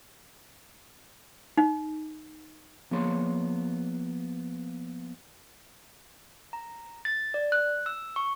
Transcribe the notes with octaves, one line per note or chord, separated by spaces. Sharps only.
D#4
F3 A#3 B3 G#4 C#5 C6
A#5
A6
D5
F#6
E6
C#6